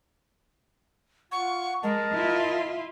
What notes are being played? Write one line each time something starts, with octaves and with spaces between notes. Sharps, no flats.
F4 F#5 C#6
G#3 A#4 D#5 A5
E4 F4